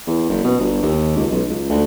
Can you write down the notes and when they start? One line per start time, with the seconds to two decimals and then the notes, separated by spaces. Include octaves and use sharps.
0.07 E2
0.29 F#1
0.44 B2
0.59 G1
0.83 D#2
1.16 C#2
1.31 B1
1.49 C#2
1.69 D2